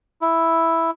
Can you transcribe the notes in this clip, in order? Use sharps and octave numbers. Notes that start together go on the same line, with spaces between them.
E4